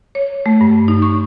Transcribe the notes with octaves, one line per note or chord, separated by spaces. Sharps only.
C#5
A3
G2
D#4
C#6